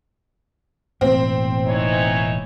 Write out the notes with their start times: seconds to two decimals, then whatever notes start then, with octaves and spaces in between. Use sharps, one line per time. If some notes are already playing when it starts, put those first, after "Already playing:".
1.01 E1 A2 A#3 C4
1.66 E3 D#4 C#5